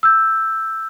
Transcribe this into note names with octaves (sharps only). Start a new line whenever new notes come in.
E6 G6